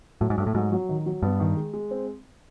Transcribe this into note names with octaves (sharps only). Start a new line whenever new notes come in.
A2 F#3
G#2
G2 A3
A2
G#2 F#3
F#3
D#3
F#3
G2 B3
D#3
G#3
G#3
C4